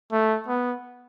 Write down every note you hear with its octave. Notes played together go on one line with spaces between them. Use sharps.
A3
B3